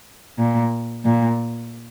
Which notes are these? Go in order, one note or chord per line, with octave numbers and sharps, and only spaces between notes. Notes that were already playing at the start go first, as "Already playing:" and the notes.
A#2
A#2